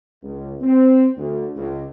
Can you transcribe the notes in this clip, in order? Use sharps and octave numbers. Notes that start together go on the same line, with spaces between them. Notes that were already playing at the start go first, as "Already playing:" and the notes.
C#2
C4
D2
C#2